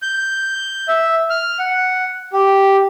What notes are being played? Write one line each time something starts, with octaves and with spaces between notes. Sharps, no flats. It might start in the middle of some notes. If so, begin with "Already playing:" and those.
G6
E5
F6
F#5
G4